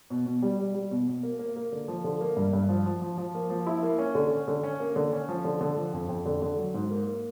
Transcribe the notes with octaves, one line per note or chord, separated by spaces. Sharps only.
B2
B2
G3
G3
G3
B2
B2
A#3
A#3
A#3
D3
F3
D3
A#3
G2
G2
F3
F3
F3
F3
A#3
F3
E4
A#3
C#4
D3
C#4
D3
C#4
A#3
D3
C#4
F3
D3
D3
F3
F2
F2
D3
D3
F#3
G#2
A#3
A#3